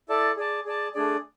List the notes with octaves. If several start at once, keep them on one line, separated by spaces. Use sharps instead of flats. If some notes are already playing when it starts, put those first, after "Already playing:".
E4 A4 D5 A5
G#4 D5 A5
G#4 D5 A5
A3 D4 G#4 D5